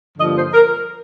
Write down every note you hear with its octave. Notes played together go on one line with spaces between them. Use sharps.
G2 D3 F3 A#3 D#5
C5
A#4